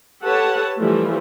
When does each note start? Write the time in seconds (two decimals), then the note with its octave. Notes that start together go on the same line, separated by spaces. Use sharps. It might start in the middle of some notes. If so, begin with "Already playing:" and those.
0.23 G4 A4 B4 C#5 F#5 A5
0.77 E3 F3 G3 A3